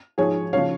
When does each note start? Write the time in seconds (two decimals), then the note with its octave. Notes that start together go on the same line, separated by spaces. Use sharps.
0.18 G#2 F3 G#4 C#5
0.53 C#3 F3 C#5 F5